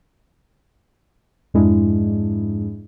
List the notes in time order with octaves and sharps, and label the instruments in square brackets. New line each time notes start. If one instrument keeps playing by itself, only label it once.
[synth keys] F2 G#2 G#3 D4 E4 G#4